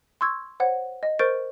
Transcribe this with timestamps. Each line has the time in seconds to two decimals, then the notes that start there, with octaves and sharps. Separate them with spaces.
0.21 C6 C#6 E6 G#6
0.60 C5 C#5 F#5
1.03 D#5
1.19 A#4 C5 C#6 G6 A6 D7